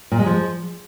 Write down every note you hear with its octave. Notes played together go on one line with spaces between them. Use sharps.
A#2
G#3
F3